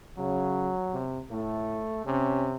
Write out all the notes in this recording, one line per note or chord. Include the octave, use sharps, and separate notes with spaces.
C#3 F#3
C3
A2 A3
C3 C#4